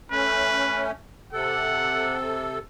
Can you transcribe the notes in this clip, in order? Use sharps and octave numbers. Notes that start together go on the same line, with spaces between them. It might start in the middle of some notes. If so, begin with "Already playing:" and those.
A3 C#4 B4
C3 A4 F#5